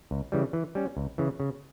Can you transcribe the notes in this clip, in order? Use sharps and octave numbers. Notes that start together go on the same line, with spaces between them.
C#2
C#3 E3 G3
E3
G3 C#4
C#2
C#3 E3
C#3